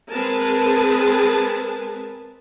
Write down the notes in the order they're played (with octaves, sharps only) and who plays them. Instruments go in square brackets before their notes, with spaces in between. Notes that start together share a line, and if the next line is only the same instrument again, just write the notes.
[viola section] G#3 C4 G#4 A#4 B4 A5